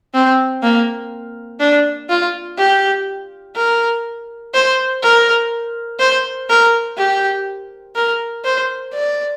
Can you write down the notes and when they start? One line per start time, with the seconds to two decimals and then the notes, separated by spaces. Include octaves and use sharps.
0.14 C4
0.62 A#3
1.60 D4
2.09 F4
2.58 G4
3.56 A#4
4.54 C5
5.02 A#4
5.99 C5
6.49 A#4
6.97 G4
7.95 A#4
8.44 C5
8.93 D5